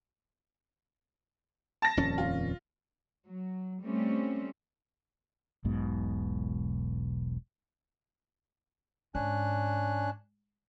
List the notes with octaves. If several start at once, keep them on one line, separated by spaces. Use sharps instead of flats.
A5 A#6
D#1 F2 C#4
F4
F#3
G3 A3 C4 C#4
E1 B1 G#2 B2
G#2 C#4 D4 F#6